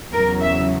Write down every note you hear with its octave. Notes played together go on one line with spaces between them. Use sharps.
E2 C#3 F#3 A#4
E5